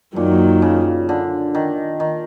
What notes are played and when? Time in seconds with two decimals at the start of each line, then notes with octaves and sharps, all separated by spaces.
0.16 F#2 A#2 D#3 F#3
0.62 C#3
1.09 D3
1.55 D#3
2.00 D#3